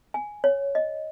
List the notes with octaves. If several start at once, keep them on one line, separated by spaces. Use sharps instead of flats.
G#5
C#5
D#5